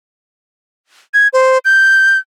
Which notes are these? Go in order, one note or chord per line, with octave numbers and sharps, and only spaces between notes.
G#6
C5
G6